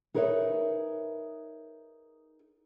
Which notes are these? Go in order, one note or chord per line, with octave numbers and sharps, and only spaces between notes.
D#4 G#4 A#4 B4 C#5 E5